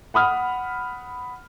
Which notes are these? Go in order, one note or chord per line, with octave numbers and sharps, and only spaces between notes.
F#5 B5 D#6 F6